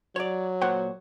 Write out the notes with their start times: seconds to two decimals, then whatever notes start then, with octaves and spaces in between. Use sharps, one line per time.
0.16 F#3 C#5 D5
0.61 A#2 C5 C#5 F#5